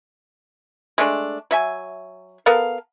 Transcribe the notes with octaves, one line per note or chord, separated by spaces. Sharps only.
G#3 A3 D4
F#3 E5 G#5
B3 A4 A#4 F5